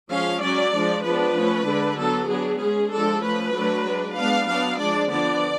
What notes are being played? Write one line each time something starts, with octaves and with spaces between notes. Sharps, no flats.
F3 G#3 C#4 F5
F#3 C#4 D5
F3 G#3 D4
F3 G#3 B3 D4 B4
F3 A3 C#4
D3 G#3 D4
F#3 B3 D4 A4
F#3 B3 D4 G#4
G#3 C#4 G#4
F3 G#3 D4 A4
F3 A3 C#4 B4
F#3 A3 D4
G#3 D4
G#3 B3 D4 F5
F#3 B3 D4 F5
F3 G#3 D4 D5
D3 F3 B3 D4 D5